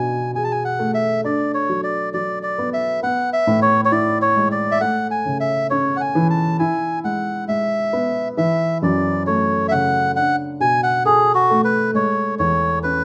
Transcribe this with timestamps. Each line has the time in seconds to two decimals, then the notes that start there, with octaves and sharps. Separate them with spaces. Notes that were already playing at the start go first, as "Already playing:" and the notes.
Already playing: B2 D4 G#5
0.35 G#4 G#5
0.44 A5
0.51 G#5
0.65 F#5
0.79 A3
0.94 E5
1.24 D4 D5
1.54 C#5
1.69 F#3
1.84 D5
2.14 F#3 D5
2.43 D5
2.58 B3
2.74 E5
3.03 B3 F#5
3.33 E5
3.47 A2
3.62 C#5
3.85 C#5
3.91 E4 D5
4.22 C#5
4.37 G#3
4.52 D5
4.71 E5
4.81 A3 F#5
5.11 G#5
5.25 C#3
5.40 E5
5.70 C#4 C#5
5.96 F#5
6.01 G#5
6.15 E3
6.30 A5
6.59 E4 G#5
7.04 G#3 F#5
7.48 G#3 E5
7.93 B3
8.37 E3 E5
8.82 F#2 D5
9.27 A3 C#5
9.68 E5
9.71 C#3 F#5
10.16 D4 F#5
10.60 B2 G#5
10.83 F#5
11.05 G#4 A4
11.35 F#4
11.51 A3
11.64 B4
11.94 G#3 C#5
12.39 E2 C#5
12.83 C#4 B4